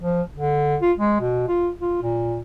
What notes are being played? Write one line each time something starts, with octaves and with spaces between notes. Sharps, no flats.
F3
D3
F4
G#3
B2
F4
F4
A#2